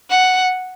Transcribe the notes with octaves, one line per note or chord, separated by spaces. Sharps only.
F#5